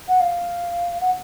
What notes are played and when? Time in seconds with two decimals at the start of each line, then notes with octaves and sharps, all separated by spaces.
0.08 F#5
0.20 F5
1.00 F#5